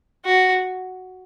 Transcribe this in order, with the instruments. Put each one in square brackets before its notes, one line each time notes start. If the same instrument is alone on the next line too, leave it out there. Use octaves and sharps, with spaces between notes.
[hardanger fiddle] F#4